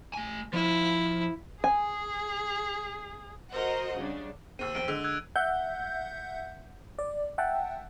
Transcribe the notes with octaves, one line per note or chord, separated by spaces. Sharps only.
A3 G#5
F3 E4
G#4 G#5
F#4 A#4 C5 D#5 F#5
C#3 G3 D4
D#2 C4 E6 D#7
A#1 C4 D7 G7
D3 G#3 E6
E6 F#6 G#6
E5 F#5 G6
D5
E5 F#5 G5 A5